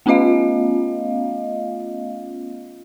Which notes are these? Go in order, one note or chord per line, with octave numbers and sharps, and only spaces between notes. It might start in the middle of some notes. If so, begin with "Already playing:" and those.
A3 B3 C#4 F4 D#5 F5